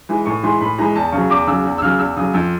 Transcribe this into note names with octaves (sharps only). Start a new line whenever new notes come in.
E3 G#3
A2 C#6
E3 G#3 C6
A2 B5
E3 G#3 A#5
E2 A5
C#3 F#3 C#6
E2 D6
C#3 F#3 E6
E2
E6
C#3 F#3 F6
E2 E6
C#3 F#3 D#6
F2 E6